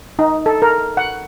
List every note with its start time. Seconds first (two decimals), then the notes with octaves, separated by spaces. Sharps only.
0.19 D#4
0.46 A4
0.62 A#4
0.97 F#5